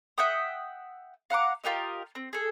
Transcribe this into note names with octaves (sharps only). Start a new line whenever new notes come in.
E5 F#5 G5 D#6
F5 F#5 A#5 D6
F4 G4 A#4 D#5
C4
G#4 A4